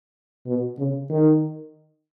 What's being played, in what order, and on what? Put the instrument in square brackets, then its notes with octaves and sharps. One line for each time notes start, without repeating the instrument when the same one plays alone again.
[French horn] B2
C#3
D#3